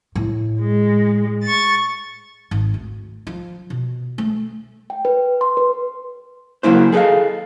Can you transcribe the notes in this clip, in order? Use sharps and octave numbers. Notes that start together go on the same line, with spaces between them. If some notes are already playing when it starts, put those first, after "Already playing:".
A2
G#3
C#6 A6
G#1
D2
F3
B2
A3
G5
B4
C6
B4
C#3 F#3 A#3 E4 C5
G#4 A4 B4 D#5 F5